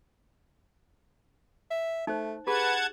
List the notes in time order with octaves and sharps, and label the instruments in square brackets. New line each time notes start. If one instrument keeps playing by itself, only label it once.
[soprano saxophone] E5
[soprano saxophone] A3 [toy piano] D#4 C5
[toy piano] G4 G#4 [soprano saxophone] B4 [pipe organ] F#5 A5 G#6